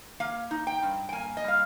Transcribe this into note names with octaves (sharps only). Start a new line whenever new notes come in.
A#3 F5
D#4
G5
G2
G5
A#3 G#5
D#5
G3 F5